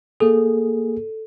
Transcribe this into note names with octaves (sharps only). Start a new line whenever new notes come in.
A#3 G#4 A4